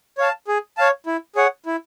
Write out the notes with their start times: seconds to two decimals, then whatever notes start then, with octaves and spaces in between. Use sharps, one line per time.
0.18 C#5 F5 A5
0.48 G#4
0.77 C#5 F5 A5
1.06 E4
1.36 G#4 C#5 F#5
1.66 E4